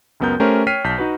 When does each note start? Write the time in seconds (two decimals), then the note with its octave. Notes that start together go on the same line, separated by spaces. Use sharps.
0.20 C#2 F#2 B3 A#4 G6
0.40 A3 C#4 G4 A#4 C5 C#5
0.67 C#5 G5 F6 B6 C7 D#7
0.84 B1 A5 G6 B6
0.98 D#4 F#4 B4